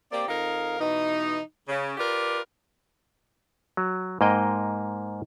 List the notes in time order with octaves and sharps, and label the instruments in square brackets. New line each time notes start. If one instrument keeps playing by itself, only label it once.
[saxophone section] A#3 C4 G4 D5
F2 D#4 A#4 F5
B2 E3 D#4
C#3
F4 G4 A#4 B4 D5
[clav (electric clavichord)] F#3
G#2 A#3 D#5 G5